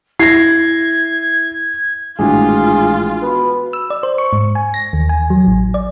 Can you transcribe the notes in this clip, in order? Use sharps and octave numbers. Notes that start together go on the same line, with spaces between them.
E4 G#6 A#6 C7
G#1 A2 E3 D4 F4 F#4 G#4
B3 F#4 B5
E6
D5
C5
C#6
G#2
G#5
A#6
D#2
G#5
F#3
A1
D5